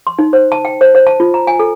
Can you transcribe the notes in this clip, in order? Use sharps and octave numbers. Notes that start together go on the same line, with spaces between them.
C6
D#4
C5
A5
G5
C5
C5
A5
F4
A#5
G#5
A4